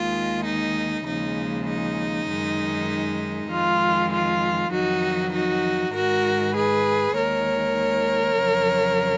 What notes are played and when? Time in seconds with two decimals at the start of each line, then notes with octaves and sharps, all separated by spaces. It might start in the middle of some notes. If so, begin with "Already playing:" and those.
Already playing: D#2 D#3 G#3 F4
0.45 D#4
1.07 D#2 C#3 F3 G#3 D#4
1.67 D#4
2.28 F#2 D#3 G#3
3.49 F2 D#3 G#3 F4
4.12 F4
4.72 F2 D#3 F#3 D#4 F#4
5.33 D#4 F#4
5.94 G#2 D#3 G#3 F#4 A#4
6.55 G#4 B4
7.15 D#2 D#3 G#3 A#4 C#5
8.38 F2 C#3 F#3